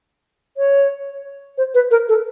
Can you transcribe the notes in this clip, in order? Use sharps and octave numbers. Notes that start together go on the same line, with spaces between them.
C#5
C5
B4
A#4
A4